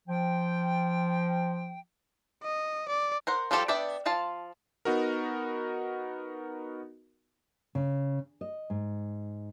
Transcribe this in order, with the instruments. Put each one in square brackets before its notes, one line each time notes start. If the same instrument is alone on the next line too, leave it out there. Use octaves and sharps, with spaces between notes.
[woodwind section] F3 G5
[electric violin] D#5
D5
[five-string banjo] A#4 C5 F#5
F3 G3 F4 G4 A4
B3 D4 D5 E5 G5
F3 F4 F5 A5
[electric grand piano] B3 D#4 F#4 A#4
[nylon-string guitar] C#3
D#5
G#2